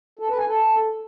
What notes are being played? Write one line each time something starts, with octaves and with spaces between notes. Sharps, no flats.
A4
B4
G#5
A4